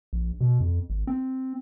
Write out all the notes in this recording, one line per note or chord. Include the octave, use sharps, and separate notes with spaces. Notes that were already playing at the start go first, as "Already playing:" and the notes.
A#1
B2
F2
G#1
C4